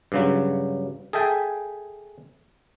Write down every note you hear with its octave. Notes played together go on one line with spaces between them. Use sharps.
G2 C#3 F#3
G#4 A4 E5 G5 G#5